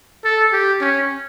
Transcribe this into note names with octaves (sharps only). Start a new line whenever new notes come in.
A4
G4
C#4